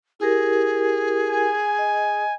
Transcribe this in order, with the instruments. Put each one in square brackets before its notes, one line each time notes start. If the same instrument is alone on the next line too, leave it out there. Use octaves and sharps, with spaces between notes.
[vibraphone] E4 G4 A#4 [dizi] G#4
[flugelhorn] G#5
[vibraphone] D#5